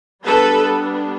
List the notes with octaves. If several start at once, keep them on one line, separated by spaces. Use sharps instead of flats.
G3 B3 D4 A4 B4